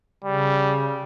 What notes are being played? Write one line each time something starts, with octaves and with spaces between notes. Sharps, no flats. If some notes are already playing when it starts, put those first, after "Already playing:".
C#3 G3